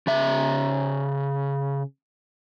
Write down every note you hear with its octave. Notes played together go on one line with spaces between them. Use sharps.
C#3 E5